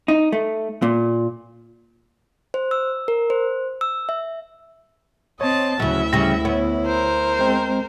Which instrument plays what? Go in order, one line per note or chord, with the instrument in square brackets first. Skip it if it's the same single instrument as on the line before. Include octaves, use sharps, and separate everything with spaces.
[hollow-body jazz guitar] D#4
A3
A#2
[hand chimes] C5
E6
A#4
C5
E6
E5
[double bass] C4 [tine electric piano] C#5 [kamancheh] D#5 A5
[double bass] D2 E4 [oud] C#3 F#3 [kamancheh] E5
[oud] C#3 G3 [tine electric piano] A#6
[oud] B3 [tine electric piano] C#5
[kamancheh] A#4 C5
[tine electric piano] G#3 C4